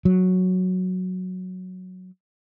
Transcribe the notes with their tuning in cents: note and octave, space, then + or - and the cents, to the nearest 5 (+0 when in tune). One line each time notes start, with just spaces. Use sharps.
F#3 -5